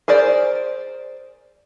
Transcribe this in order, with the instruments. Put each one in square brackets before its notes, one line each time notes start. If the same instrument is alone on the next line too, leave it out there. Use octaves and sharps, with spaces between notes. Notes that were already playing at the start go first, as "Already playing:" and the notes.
[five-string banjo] G#4 A#4 C5 D5